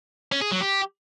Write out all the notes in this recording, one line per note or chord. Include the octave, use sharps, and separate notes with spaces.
C#4
G#4
F#3
G4